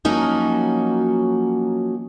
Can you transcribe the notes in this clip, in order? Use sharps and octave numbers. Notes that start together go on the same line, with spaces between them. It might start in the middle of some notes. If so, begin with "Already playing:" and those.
F3 F#3 A#3 C#4 D#4 F#4